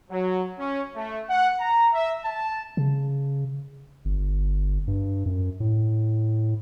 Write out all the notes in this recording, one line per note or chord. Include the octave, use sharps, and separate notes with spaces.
F#3
C#4
A3
F#5
A#5
E5
A5
C#3
G1
G2
F#2
A2